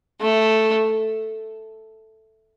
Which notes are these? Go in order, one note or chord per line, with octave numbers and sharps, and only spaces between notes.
A3